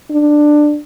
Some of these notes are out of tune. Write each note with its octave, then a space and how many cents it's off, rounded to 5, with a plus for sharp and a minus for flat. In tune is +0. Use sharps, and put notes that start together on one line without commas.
D4 +15